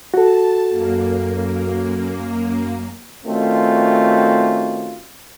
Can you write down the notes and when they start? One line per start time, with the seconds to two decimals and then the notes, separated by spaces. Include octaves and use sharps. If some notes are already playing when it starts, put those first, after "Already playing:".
0.14 F#4 A4 A5
0.69 F#2 A#3
3.25 D#3 A3 C4 C#4 F4 F#4